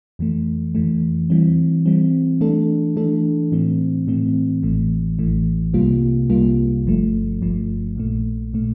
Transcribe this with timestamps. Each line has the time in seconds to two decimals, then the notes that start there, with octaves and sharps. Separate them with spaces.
0.19 F2 E3 A3
0.75 F2 E3 A3
1.30 E3 G3 C4
1.86 E3 G3 C4
2.41 E3 A3 D4 A4
2.96 E3 A3 D4 A4
3.52 A2 E3 A3 C4
4.07 A2 E3 A3 C4
4.63 A1 A2 E3 A3
5.19 A1 A2 E3 A3
5.74 C2 C3 G3 A#3 F4
6.30 C2 C3 G3 A#3 F4
6.85 G1 G2 F3 A3
7.41 G1 G2 F3 A3
7.96 A#1 A#2 A3
8.54 A#2 A3